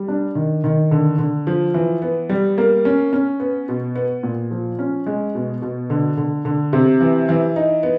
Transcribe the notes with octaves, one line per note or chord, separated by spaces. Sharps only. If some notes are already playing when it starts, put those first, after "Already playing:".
Already playing: G3
D4
D#3
D#3
D3
D3
F3
E3
B3
G3
A#3
C#4
C#4
B3
B2
B3
A#2
F3
C#4
G#3
B2
B2
D3
D3
D3
C3
E3
E3
D#4
B3